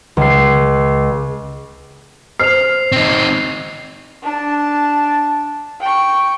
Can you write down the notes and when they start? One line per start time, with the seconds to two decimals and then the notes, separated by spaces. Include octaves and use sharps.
0.17 C#2 C7
2.40 C5 F6 C7 F7
2.92 C4 D#4
4.22 D4 A5
5.80 G5 C#6